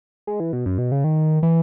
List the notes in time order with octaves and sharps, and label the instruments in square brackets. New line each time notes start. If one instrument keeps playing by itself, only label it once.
[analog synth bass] G#3
E3
B2
F#2
B2
C#3
D#3
E3